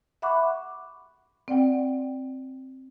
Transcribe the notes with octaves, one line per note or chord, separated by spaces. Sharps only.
E5 F#5 B5 C#6 D6 F#6
C4 D5 F#5 G5